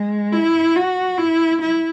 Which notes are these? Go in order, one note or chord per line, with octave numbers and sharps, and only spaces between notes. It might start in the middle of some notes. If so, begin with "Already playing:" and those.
Already playing: G#3
E4
F#4
E4
E4